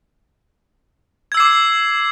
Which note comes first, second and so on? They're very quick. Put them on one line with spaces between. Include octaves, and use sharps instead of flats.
G#6 E6 C7 D6